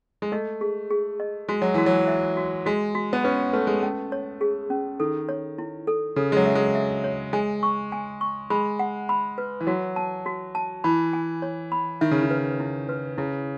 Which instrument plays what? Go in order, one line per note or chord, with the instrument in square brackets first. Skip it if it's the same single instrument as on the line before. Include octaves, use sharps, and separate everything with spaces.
[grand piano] G#3
[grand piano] A3 [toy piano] D#5
[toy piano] G#4
G#4
D#5
[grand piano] G#3 [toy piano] F#4
[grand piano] F#3
[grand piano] E3 [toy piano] F#4
[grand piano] F#3
[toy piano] E5
F#4
[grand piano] G#3 [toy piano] F#4
[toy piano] F#4
[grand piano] B3
[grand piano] C#4 [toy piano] B4
[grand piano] A3 [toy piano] B4
[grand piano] G#3
[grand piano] A3 [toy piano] C#4
[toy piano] C#5
G#4
C#4
[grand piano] D#3 [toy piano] A4
[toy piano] C#5
E4
A4
[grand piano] C#3 [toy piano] A4
[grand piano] G#3
F#3
[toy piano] E5
[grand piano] G#3
[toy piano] E5
C#5
[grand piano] G#3 [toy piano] G#5
[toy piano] C#6
G#5
C#6
[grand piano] G#3 [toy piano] B5
[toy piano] F#5
B5
B4
[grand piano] E3
[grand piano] F#3 [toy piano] F#4
[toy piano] A5
F#4
A5
[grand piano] E3 [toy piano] B5
[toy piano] G#5
C#5
B5
[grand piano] D#3 [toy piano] E5
[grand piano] C#3
D#3
[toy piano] B4
E4
B4
[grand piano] C#3 [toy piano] E4